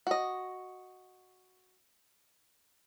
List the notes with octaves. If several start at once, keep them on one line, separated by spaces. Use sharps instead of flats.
F#4 D#5